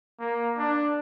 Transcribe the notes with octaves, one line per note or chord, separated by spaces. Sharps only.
A#3
D4